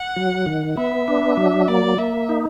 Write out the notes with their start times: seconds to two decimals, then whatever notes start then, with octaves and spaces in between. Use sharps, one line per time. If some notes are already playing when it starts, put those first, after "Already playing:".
Already playing: F#5
0.16 F#3
0.46 D#3
0.77 B3 E5
1.08 D4
1.37 F#3
1.68 A#3 D5
1.98 A#3 E5
2.29 D#4